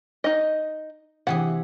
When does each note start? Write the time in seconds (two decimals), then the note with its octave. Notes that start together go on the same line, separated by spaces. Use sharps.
0.24 D#4 D#5
1.27 C3 E3 G#4 F#5